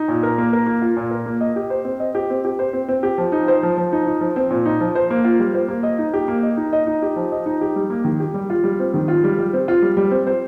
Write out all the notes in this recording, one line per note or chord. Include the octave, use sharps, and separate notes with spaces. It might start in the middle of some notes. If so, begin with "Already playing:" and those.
Already playing: D#4
A#2
A#4
A#3
A#4
A#3
F4
A#2
A#4
A#3
D#5
G4
C5
C4
D#5
G4
C4
G4
C5
C4
C4
G4
F3
D#4
C5
F3
F3
D#4
D#4
F3
C4
A#2
D#4
F3
C5
A#3
F4
G3
C5
A#3
D#5
D#4
G4
A#3
D#5
D#4
D#5
D#4
G4
F3
D#5
D#4
G4
G3
A#3
D#3
G4
G3
F4
G3
C4
D#3
F4
G3
G3
C4
F4
G3
G3
C4
C5